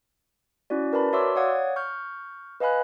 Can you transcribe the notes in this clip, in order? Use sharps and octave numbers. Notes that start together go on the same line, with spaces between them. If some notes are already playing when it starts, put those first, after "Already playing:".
C#4 E4 F#4 D5
A#4 B4 D5 A5 B5
F#4 C#5 E5 C6 D6 E6
C#5 D5 F5 F#5 D#6 G#6
C#6 F6 G6
B4 D#5 F5 G#5 B5 F#6